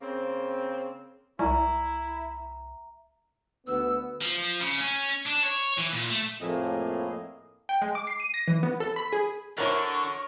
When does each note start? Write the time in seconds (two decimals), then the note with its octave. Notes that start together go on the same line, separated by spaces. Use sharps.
0.01 C#3 A#3 C4
1.39 C2 E4 E5 A#5
3.67 D2 B3 E6
4.22 F3
4.61 C#3
4.81 C#4
5.26 D4
5.43 C#5
5.78 E3
5.92 A#2
6.10 A3
6.41 F2 A2 A#3 G#4 D#5
7.69 G5
7.82 G#3
7.95 D6
8.07 C7
8.20 D#7
8.34 A#6
8.48 E3
8.63 B3
8.80 A4
8.96 B5
9.13 G#4
9.58 D3 E4 F#4 A#4 C#5 C#6